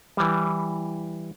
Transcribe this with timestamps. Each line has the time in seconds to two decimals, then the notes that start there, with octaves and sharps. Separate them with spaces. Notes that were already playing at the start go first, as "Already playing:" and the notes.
0.17 E3 G3